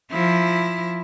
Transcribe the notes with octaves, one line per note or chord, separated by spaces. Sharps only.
F3 E4